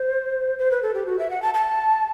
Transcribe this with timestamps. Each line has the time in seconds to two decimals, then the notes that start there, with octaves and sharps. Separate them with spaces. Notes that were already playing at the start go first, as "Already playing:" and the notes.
Already playing: C5
0.59 C5
0.71 B4
0.82 A4
0.94 G4
1.06 F#4
1.19 E5
1.30 F#5
1.42 A5
1.54 A5